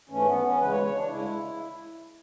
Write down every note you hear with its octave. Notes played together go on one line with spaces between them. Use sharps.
G#2 E3 A3 C#4
B3
C#4
D2 C#3 E3 G#3 B4
C#5
C#5
D4
D2 C#3 G#3 E4